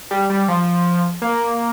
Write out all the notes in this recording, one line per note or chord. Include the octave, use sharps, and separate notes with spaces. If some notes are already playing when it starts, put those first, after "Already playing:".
G3
G3
F3
A#3